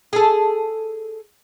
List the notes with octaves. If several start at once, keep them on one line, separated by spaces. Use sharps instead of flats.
G#4 A4